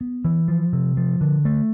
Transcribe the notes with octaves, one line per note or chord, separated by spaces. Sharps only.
B3
E3
F3
C3
F3
D3
A3